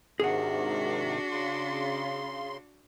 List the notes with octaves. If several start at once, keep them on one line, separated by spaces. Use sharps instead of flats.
G#2 C3 D#3 D4 F#4 G#4 F#5
C#3 C6